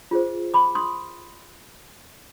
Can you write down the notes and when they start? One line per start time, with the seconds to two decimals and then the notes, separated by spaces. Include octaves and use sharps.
0.11 F4 G#4 C5
0.54 B5 D6
0.75 C6 D#6